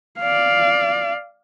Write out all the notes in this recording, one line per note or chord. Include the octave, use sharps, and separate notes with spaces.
D5 F5